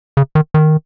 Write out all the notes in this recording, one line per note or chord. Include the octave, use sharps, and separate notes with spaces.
C#3
D#3
D#3